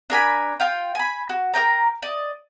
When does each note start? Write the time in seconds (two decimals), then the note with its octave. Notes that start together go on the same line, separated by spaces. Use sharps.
0.10 D4 A#4 G#5 B5
0.60 F4 F5 G5
0.95 G#5 B5
1.29 F#4
1.54 A#4 D5 G5 A#5
2.02 D5 D#5